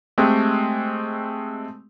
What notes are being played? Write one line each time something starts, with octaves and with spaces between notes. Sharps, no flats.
G#3 A3 C4 G4